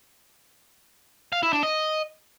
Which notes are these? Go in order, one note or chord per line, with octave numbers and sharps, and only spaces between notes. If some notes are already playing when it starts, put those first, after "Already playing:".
F5
E4
D4
D#5